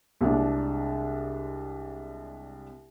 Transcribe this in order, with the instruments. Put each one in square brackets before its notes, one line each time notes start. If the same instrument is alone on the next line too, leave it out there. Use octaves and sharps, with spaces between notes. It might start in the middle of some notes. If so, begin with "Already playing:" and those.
[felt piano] C2 G#3 D4